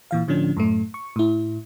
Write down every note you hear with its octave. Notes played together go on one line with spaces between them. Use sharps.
A#2 E3 F5
A2 D3 F3 C#4 D4
F#2 A2 A3
C#6
A2 E4